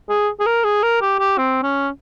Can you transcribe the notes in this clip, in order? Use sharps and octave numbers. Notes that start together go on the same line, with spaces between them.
G#4
G#4
A#4
G#4
A#4
G4
G4
C4
C#4